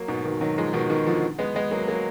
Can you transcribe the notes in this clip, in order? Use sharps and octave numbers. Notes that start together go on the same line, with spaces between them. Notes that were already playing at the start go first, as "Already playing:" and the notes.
Already playing: F#3 A#3
G#2 B2
B2 D#3
D#3 F#3
F3 G#3
B2 D#3
B2 D#3
D3 F3
G#3 B3
G#3 B3
F#3 A#3
F#3 A#3